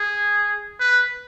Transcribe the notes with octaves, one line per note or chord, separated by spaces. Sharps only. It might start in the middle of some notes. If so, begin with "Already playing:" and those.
Already playing: G#4
B4